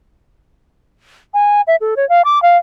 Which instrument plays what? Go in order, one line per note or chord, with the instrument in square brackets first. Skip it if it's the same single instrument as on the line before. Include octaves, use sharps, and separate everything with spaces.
[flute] G#5
E5
A4
C#5
F5
D6
F5